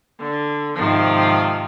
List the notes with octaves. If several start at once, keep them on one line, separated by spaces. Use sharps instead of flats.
D3
G#2 C3 D#3 F3